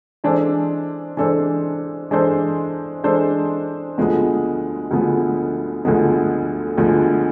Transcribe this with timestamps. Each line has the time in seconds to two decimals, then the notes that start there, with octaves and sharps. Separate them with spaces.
0.24 E3 G#3 D4 A4 C5
1.17 E3 G#3 D4 A4 C5
2.11 E3 G#3 D4 A4 C5
3.04 E3 G#3 D4 A4 C5
3.98 D2 D3 F3 G#3 B3
4.91 D2 D3 F3 G#3 B3
5.85 D2 D3 F3 G#3 B3
6.78 D2 D3 F3 G#3 B3